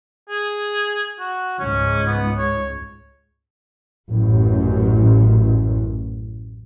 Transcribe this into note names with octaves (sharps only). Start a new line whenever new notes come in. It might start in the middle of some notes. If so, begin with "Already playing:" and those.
G#4
F#4
C#2 G#2 C#4
B3
C#5
A1 F#2